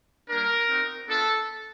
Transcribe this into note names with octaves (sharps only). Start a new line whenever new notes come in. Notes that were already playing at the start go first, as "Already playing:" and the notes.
G3 A#3 D4 A#4
C4 D#4 F#4
B3 D4 F4 A4